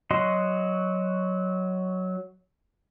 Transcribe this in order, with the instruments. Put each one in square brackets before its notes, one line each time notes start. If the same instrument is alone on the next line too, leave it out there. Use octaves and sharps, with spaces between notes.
[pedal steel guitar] F#3 F#4 D#5 C6